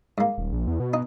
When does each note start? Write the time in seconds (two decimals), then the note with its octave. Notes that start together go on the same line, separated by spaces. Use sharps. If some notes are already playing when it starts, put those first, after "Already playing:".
0.18 G#2 A#3
0.38 D#1
0.53 A#1
0.67 E2
0.80 B2
0.94 D#4